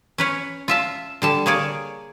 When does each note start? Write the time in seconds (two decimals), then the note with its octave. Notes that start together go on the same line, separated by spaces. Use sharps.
0.18 C#4 B4 C#5
0.68 F4 E5 A5
1.22 D3 G3 A5
1.46 A#3 G#4 C#5 D5